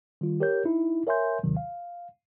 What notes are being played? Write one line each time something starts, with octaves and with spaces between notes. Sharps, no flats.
D#3 G3 F4
G4 A#4 C#5 G6
D#4 E4
A#4 C#5 E5 G#5 C6 G6
A#1 D#2 C3 D#3 F#3
F5